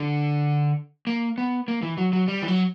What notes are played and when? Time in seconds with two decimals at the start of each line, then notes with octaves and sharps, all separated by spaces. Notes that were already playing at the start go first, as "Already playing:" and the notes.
Already playing: D3
1.07 A#3
1.38 B3
1.68 A#3
1.82 E3
1.98 F#3
2.13 F#3
2.28 G3
2.42 E3
2.48 F#3